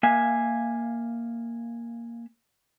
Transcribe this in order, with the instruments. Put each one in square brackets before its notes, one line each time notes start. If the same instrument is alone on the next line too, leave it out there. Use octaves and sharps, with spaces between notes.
[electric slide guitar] A#3 E5 F5 G#5